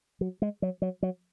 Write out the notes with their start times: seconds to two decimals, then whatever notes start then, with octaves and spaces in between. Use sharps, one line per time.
0.21 F#3
0.42 G#3
0.62 F#3
0.82 F#3
1.03 F#3